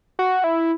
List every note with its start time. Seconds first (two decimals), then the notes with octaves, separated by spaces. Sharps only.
0.19 F#4
0.44 E4